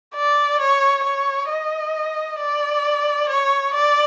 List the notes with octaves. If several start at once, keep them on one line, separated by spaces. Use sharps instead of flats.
D5
C#5
C#5
D#5
D5
C#5
D5